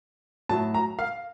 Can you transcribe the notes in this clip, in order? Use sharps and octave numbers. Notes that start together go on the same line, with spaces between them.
A2 F#3 A3 A5
A#5
F5